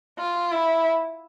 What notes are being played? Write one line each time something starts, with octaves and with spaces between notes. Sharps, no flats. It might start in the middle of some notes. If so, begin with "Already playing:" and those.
F4
E4